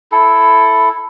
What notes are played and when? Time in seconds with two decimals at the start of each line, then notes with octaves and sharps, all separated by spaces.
0.12 E4 A4